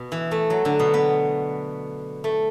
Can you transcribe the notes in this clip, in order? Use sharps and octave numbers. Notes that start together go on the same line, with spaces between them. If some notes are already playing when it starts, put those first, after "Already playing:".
Already playing: B2
E3
A3
F#3
D3
B2
B3
A3